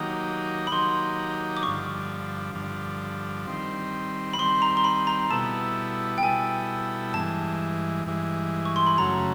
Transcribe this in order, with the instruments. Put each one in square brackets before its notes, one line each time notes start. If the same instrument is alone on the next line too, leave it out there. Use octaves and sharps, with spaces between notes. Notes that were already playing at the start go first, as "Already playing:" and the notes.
Already playing: [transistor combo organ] D#3 F#3 A#3 D#4 G4
[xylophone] B5
[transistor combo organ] D#3 F#3 A#3 D#4 G4 [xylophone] C6
[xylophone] D6
[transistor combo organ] G2 D3 F3 [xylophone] C#6
[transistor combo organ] G2 D3 F3
D#3 G3 C4
[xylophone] B5
[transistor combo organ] D#3 G3 C4 [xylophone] C6
[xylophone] A#5
C6
B5
A#5
[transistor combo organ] B2 G3 B3 E4 A4 [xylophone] A5
[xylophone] G5
[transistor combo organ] B2 G3 B3 E4 A4 [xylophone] G#5
[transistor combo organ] G2 E3 G#3 [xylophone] A5
[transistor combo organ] G2 E3 G#3
[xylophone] C#6
C6
B5
[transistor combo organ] F#2 C#3 F#3 A3 [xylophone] A#5